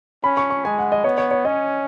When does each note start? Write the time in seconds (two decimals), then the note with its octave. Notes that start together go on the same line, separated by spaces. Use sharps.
0.24 C#4 B5
0.37 C#6
0.50 C#6
0.65 G#3 G#5
0.78 F#5
0.92 D#5
1.04 B3 C#5
1.18 C#5
1.31 C#5
1.45 C#4 D#5